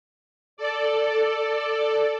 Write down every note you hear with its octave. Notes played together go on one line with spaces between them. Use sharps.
A4 D5